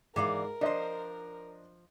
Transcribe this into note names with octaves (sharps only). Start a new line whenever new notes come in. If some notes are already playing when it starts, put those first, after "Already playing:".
G#2 E3 A#4 D5 F5
F3 D4 C5 D#5